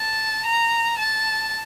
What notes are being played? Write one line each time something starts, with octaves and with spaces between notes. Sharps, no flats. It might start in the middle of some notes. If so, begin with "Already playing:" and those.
Already playing: A5
A#5
A5